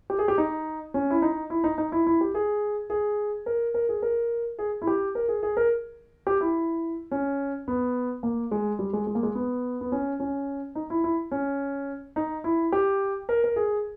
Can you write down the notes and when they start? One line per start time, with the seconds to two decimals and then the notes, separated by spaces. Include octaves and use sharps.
0.10 G4
0.19 G#4
0.28 G4
0.38 D#4
0.94 C#4
1.11 E4
1.22 D#4
1.50 E4
1.64 D#4
1.78 D#4
1.92 E4
2.07 E4
2.21 G4
2.35 G#4
2.90 G#4
3.46 A#4
3.74 A#4
3.89 G#4
4.02 A#4
4.59 G#4
4.82 E4
4.87 G4
5.15 A#4
5.28 G#4
5.43 G#4
5.57 A#4
6.27 G4
6.41 E4
7.11 C#4
7.68 B3
8.23 A#3
8.51 G#3
8.79 G3
8.93 G#3
9.07 G#3
9.15 A#3
9.23 G#3
9.35 B3
9.81 B3
9.92 C#4
10.20 C#4
10.75 D#4
10.90 E4
11.04 E4
11.31 C#4
12.16 D#4
12.44 E4
12.72 G4
13.29 A#4
13.44 A#4
13.56 G#4